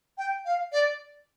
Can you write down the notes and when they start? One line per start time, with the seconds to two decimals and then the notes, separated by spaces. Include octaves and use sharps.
0.18 G5
0.45 F5
0.72 D5